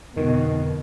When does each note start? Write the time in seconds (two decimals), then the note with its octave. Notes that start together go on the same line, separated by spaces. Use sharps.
0.16 F2 B2 D3 D#3